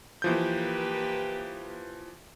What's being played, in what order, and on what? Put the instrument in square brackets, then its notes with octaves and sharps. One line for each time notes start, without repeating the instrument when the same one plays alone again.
[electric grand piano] E3 F3 G6 [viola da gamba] A#3 G4 B4